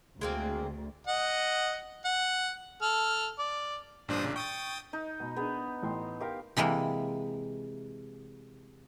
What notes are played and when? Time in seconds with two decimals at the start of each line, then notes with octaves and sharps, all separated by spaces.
0.21 D2 G#3 A#3 C4
1.07 D#5 F#5
2.05 F#5
2.82 A4 F6
3.39 D5
4.08 A1 G2 A#2 D4 C5 D#6
4.25 C#3
4.36 G5 C#6 D#6 A6
4.93 D#4
5.20 B2
5.36 B3 D4 G#4
5.83 A1 G5 C6
6.20 G4 A#4 F5 C6
6.57 C3 E3 G#3 A#3